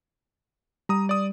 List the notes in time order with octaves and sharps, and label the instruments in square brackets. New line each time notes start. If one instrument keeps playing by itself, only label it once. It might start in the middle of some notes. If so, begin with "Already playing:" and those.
[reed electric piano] G3 [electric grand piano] A#5 D#6
[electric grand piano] D5 D#6